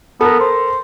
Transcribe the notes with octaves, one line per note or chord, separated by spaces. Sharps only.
B3 A4 A#4
C5